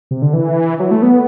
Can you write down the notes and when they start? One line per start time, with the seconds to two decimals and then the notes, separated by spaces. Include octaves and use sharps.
0.11 C3
0.22 D3
0.33 E3
0.80 F#3
0.91 A3
1.02 B3